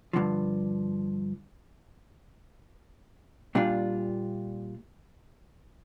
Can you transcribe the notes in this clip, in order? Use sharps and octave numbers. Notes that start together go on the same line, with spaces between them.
G2 D3 F3
A#2 G3 D4 F4